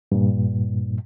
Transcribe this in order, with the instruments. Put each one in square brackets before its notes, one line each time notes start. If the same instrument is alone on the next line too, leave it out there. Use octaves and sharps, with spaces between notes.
[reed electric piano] G2 A#2